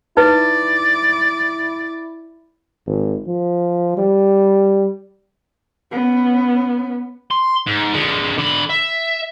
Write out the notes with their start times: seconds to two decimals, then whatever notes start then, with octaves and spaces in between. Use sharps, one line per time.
0.17 D#4 E4 B4 D5
2.86 G#1
3.27 F3
3.98 G3
5.92 B3 C#4
7.31 C6
7.66 G#2
7.93 D3 G#3
8.38 D3 B5
8.69 E5